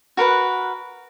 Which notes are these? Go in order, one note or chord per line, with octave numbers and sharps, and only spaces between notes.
F#4 A#4 B4 F#5